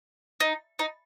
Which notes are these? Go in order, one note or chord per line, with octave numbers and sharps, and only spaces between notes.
D#4
D#4